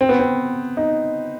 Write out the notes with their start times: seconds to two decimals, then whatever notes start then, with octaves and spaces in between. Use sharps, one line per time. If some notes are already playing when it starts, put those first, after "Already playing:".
0.01 C4
0.09 B3
0.19 C4
0.77 D#4